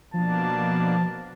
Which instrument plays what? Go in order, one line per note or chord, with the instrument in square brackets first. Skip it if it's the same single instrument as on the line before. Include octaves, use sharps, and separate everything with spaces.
[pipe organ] B2 A#3 D4 [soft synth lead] F3 [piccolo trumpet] A5